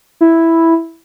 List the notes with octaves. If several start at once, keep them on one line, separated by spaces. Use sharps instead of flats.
E4